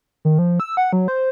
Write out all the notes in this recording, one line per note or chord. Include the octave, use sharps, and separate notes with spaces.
D#3
F3
E6
F#5
F#3
C5